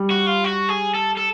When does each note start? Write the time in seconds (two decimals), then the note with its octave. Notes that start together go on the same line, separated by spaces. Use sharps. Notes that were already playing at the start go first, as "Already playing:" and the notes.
Already playing: G3
0.11 F#4
0.27 F4
0.44 F#4
0.69 G#4
0.94 A4
1.17 A4